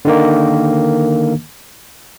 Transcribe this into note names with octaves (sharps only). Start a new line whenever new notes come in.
D3 D#3 A#3